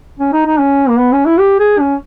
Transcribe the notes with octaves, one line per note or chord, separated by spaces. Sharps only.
C#4
D#4
D#4
C#4
A#3
B3
C#4
E4
G4
G#4
C#4